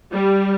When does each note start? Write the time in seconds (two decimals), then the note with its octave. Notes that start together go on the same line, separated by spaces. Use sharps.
0.11 G3